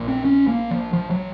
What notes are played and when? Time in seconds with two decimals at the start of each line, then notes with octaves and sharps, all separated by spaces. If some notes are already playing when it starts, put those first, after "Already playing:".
Already playing: A#1 A#2
0.08 C4
0.25 C#4
0.47 A#3
0.71 F3
0.93 F3
1.10 F#3